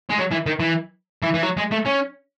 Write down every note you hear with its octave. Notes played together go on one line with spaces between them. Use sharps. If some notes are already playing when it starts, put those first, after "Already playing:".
G#3
F#3
E3
D#3
E3
E3
E3
F#3
G#3
A3
C#4